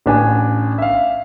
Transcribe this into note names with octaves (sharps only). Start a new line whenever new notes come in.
A1 D4 G#5
E5 F5